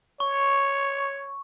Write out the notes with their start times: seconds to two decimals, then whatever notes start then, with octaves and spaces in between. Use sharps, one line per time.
0.20 C#5 C#6